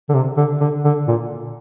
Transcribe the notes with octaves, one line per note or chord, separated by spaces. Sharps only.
D3
C3
D3
D3
D3
A#2